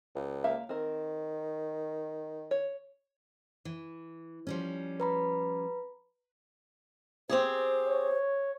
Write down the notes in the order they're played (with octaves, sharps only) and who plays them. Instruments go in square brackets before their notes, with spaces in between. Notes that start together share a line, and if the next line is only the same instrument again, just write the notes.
[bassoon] C#2
[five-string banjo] A#3 E5 F5
[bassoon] D#3 [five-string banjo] C4 A#4
[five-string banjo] C#5
[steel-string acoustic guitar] E3
F3 G3 C#4
[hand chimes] B4 A#5 B5
[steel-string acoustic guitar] C4 G4 G#4 [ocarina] C5
[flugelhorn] C#5